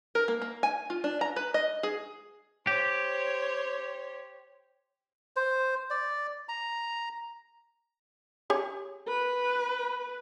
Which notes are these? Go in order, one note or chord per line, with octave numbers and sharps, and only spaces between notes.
A#4
A#3
A#3
G#5
F4
D4
A#5
B4
D#5
G#4
G4 C5 C#5
C5
D5
A#5
G4 G#4 C#5
B4